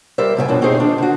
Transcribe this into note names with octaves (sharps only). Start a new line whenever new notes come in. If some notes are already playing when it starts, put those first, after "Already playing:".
G3 G4 A#4 C5 D5 E5
G2 C#3 F4 C5 G5 G#5
D2 G2 B2 F3 C#4 D4
C4 C#4 D#4 G4 G#4 C5
D#3 D4 F4
D3 F#4